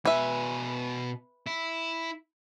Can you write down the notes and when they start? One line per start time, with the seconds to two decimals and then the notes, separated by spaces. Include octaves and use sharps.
0.05 B2 B4 E5 G#5
1.46 E4